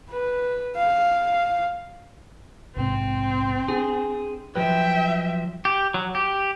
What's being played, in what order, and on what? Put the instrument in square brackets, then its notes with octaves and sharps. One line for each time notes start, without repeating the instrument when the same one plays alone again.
[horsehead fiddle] B4
F5
[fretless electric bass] A#1 G#2 C3 [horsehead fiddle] C4
[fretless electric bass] D4 [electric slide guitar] G#4
[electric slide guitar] F3 F#3 B4 [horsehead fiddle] E5 G5
[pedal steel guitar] G4
F#3
G4